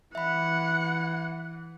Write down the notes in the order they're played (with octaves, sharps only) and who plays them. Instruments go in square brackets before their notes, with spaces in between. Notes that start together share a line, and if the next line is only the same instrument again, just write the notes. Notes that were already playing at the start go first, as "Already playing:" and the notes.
[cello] E3 [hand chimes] E5 B5 [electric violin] F#5